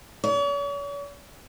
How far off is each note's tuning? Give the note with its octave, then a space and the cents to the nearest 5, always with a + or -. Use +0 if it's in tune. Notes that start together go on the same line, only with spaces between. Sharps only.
C#5 +45